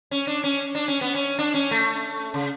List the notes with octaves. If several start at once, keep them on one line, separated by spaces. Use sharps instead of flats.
C#4
D4
C#4
D4
C#4
B3
C#4
D4
C#4
A3
C#3